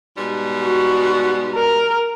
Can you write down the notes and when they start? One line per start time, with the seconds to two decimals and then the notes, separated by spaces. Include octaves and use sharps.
0.17 G#2 B2 G3
0.62 F#4
1.55 A#4